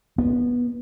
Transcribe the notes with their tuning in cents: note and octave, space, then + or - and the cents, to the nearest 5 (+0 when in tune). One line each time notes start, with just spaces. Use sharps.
B3 -20